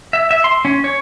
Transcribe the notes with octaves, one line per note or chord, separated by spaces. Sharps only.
E5
E5
C6
C#4
C#5